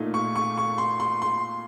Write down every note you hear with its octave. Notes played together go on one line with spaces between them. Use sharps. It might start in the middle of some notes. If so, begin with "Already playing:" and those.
Already playing: A#2 A3 D#4
C#6
C#6
C#6
C6
C6
C6